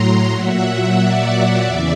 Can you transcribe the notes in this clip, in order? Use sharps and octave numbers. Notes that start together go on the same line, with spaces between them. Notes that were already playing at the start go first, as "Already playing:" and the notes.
Already playing: A2 F#3 A#5 C6
A#2 F#3 E5 F#5
D5 E5
E2 C#3 E3